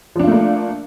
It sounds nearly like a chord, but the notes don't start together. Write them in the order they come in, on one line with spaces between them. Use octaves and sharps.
F3 D4 F4 A3 A#3